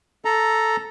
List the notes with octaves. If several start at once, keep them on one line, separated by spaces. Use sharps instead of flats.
A4 A#5